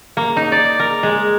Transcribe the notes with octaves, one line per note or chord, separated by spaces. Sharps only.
A#3
D#4
D5
A#4
G#3